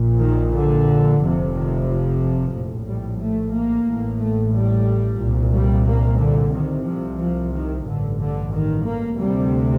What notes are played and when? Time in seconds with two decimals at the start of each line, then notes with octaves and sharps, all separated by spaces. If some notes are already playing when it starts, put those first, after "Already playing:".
Already playing: A#1 A#2
0.21 D#3
0.54 D3
1.21 F1 F2 C3
1.55 D#3
1.88 F3
2.54 A#1 A2
2.87 G3
3.21 A3
3.55 A#3
3.87 A1 A2
4.21 A3
4.54 G3
5.21 C2 A#2
5.54 G3
5.88 A#3
6.20 D3
6.53 C2 C3 D#3
6.87 F3
7.20 F3
7.54 D#3
7.87 A1 G2 D3
8.20 D3
8.54 D#3
8.87 A#3
9.21 D2 C3 G3